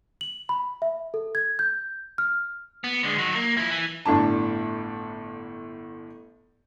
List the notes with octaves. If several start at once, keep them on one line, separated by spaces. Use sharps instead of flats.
F#7
B5
E5
A4
G#6
G6
F6
B3
D3 G#3
D#3 F#3
A#3
F3 E4
E3
G1 A2 D4 A5